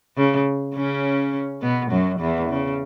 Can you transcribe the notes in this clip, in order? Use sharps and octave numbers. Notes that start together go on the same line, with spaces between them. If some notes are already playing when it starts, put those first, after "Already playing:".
C#3
C#3 C#4
B2 B3
F#2 F#3
E2 E3
C#3